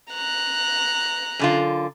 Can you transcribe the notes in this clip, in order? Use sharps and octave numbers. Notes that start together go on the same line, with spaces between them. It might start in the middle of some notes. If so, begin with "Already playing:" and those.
A#5 F#6
F#2 D3 F4